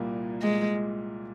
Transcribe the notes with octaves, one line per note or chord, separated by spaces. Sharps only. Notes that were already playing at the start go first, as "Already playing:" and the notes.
Already playing: C2 A#2 G3 A#3
G#3